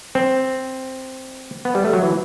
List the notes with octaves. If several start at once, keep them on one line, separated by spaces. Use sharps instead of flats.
C4
B3
G3
A3
F#3
E3